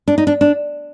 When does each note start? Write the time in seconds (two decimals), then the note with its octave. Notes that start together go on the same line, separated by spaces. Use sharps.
0.08 D4
0.18 D#4
0.27 D4
0.41 D4